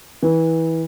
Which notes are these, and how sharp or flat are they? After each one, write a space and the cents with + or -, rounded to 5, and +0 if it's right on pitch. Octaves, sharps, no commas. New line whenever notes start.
E3 -20